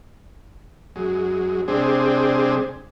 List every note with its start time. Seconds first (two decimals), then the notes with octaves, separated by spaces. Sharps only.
0.96 F#2 G#3
1.68 C3 G3 G#3 C4 D4 G#4